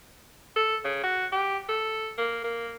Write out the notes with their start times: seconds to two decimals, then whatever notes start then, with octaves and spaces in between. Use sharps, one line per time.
0.56 A4
0.84 C#3
1.03 F#4
1.32 G4
1.69 A4
2.18 A#3
2.44 A#3